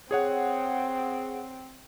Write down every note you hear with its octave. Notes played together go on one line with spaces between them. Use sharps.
C4 G#4 C#5 F#5